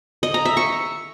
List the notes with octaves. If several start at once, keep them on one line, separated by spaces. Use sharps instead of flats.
D#5
A#5
E5
C#6